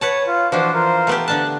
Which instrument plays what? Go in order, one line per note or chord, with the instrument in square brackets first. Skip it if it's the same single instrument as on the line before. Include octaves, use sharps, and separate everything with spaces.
[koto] B4 F#5 A5 [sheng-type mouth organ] C#5
[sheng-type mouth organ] F4
[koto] E3 F3 [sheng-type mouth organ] D4 F#4 C5
[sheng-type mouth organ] F4 A#4 C5
[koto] A3 B3 G4
[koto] D3 D4 A5 [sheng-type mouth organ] F#6